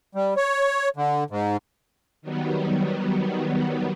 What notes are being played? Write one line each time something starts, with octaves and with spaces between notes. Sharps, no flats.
G3
C#5
D3
G#2
D#3 F#3 G3 B3